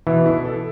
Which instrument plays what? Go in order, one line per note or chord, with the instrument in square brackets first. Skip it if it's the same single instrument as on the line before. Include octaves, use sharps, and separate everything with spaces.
[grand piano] B2 [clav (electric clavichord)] E3
[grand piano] E4
A4